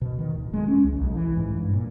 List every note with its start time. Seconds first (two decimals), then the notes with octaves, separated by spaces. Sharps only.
0.01 B2
0.19 D#3
0.35 D1
0.53 G#3
0.68 C#4
0.84 C#2
0.98 B1
1.15 E3
1.37 G#2
1.57 G2
1.73 A#2